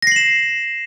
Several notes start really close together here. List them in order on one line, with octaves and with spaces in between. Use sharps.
A#6 C7 F#7 E7